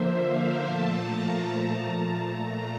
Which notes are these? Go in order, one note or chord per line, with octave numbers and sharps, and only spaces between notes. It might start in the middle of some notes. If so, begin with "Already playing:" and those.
Already playing: D3 F3 A#3 C5 E5
F5
A#2 F3 A3 A5
A#5
A#5
A#2 A3